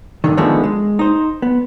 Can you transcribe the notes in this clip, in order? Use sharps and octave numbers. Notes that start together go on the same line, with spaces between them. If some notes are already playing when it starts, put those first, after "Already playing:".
G2 D3 D#3
D3 D#3 F3 G#3 A3 B3
G#3
D#4 C5
B3